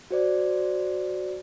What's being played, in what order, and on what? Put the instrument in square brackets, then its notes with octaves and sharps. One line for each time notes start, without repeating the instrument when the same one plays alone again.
[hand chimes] F#4 C5 D5